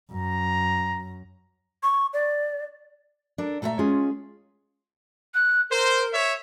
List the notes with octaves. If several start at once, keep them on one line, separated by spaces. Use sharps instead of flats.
F#2 A#5
C#6
D5
D4 A4 A#4
A#2 A3 F#4 B4 E5 A#5
G#3 C#4 F4 G#4
F#6
A#4 C5
C#5 E5